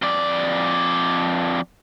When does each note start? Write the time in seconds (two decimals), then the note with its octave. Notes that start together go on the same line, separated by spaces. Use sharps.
0.02 F2 D5